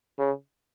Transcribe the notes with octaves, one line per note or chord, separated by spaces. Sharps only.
C#3